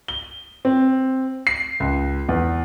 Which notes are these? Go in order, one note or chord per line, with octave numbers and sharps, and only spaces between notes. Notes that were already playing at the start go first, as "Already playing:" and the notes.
G7
C4
C7
C#2
E2